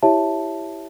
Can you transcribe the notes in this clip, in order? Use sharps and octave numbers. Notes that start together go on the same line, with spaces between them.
E4 G4 C#5 E5 A5